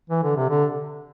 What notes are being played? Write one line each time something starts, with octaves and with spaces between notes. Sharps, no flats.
E3
D3
C3
D3